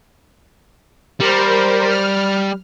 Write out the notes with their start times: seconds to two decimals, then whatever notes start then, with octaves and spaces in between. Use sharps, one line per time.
1.21 G3 A#4 C5
1.90 F6